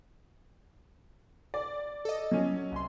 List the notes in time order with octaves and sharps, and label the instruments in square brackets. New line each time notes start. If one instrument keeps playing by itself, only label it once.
[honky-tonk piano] D5
[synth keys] A4 D#5
[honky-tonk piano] F#3 C#4
[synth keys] C2 C6